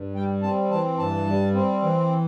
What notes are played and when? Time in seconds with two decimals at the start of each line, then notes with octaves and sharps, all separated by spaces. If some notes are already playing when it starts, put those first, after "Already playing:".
Already playing: G2
0.15 G3 G5
0.43 C4 A5
0.71 E3 A5
0.98 G2 A5
1.27 G3
1.55 C4
1.83 E3